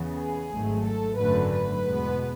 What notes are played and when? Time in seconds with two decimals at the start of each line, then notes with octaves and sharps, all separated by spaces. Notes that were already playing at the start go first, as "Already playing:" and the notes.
Already playing: E2 C#3 E3 B3
0.15 G#4
0.49 G#1 G#2 F#3 A3
0.83 A4
1.17 G#1 F#2 D3 F#3 A3 B4
1.51 B4
1.85 E2 B2 G#3 B3